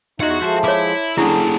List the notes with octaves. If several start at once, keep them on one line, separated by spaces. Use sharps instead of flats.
E2 D#4 F4 F#4 C#5 E5 F#5
F3 G#3 A4 C5 E5
E4 C#5 D6
D3 F#3 G3 A#3 C#4 E4 G#4